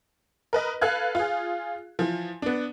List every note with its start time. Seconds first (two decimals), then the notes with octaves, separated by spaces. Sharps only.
0.53 A#4 B4 D#5
0.81 A4 B4 F5 F#6 G#6
1.15 F4 G#4
1.99 E3 F3
2.42 B3 D4